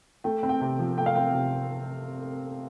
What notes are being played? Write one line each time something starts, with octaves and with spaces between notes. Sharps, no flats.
A3 G5
C4
G5
C3
F3
A3 G5
F5
C4 G5
C3